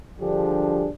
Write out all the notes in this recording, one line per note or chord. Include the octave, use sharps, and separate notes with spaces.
D3 F3 G3 D4 G4 G#4